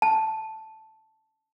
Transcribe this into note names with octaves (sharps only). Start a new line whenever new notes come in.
A5